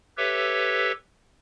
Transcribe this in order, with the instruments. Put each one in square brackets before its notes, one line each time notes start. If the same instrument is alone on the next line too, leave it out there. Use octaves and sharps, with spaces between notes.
[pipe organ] G4 A4 B4 C#5 E5